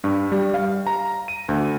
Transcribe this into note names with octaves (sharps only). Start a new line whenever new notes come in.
G2
G3
F5
A#5
D#7
D2